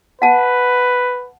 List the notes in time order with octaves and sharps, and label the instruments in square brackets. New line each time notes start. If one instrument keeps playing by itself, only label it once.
[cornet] B4 [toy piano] F#5 A5